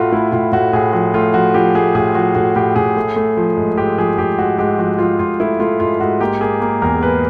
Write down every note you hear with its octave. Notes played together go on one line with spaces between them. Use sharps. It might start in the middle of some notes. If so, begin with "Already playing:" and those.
Already playing: A2 A3 F4 F#4
A3 E4
A2 F4
A2 F#4
A2 G#4
F3 F#4
A3 F4
F3 F#4
F3 G4
A3 G#4
A2 G#4
F3 F#4
A2 F#4
A2 G4
A2 G#4
A3
A3
F3
G#2
G#2 G4
F3 G#4
G#2 G4
G#2 F#4
G#2 G4
F3 F#4
F3 F4
G#2 F4
A3 E4
A3 F4
G#2 F4
G#2 F#4
A#3 G4
A#3 G#4
A#3
E2 A#4
A#3 B4